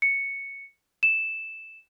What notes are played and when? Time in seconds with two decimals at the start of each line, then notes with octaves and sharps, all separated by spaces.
0.02 C#7
1.03 E7